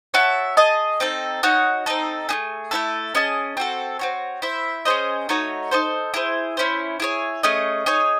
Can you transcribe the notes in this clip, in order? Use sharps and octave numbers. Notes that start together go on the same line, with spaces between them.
F#4 C#5 E5 A5
G#4 D#5 A5
C4 D#4 A4
D#4 F#4 C#5 F#5
C4 D#4 A4
A3 D#4 G#4
A3 C#4 E4 A4
C#4 G#4 D#5 A5
C4 F#4 A4
C4 F#4 C#5
E4 C5 E5
C#4 G#4 C5 D#5
A3 D#4 F#4 C#5
D#4 A4 C5
E4 G#4 C5
C#4 E4 C5
E4 G#4 C#5
A3 C#4 G#4 D#5
D#4 G#4 C#5